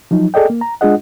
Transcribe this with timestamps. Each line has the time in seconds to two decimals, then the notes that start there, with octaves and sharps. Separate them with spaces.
0.11 F3 F#3 D#4
0.34 G#4 A4 D5 D#5 G5
0.50 A#3
0.61 A#5
0.81 G#3 D4 F4 G#4 D#5 F#5